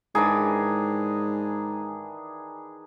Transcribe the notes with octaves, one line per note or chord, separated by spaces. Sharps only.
G#2 D#3 E3 D4 G#4